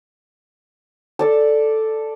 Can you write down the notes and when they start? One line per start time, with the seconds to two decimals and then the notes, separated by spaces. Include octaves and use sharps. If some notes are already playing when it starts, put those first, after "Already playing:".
1.19 A4 D5 A5